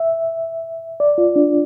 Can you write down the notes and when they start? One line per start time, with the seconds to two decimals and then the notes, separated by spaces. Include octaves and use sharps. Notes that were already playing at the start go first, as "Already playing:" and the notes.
Already playing: E5
1.00 D5
1.18 F4
1.36 D4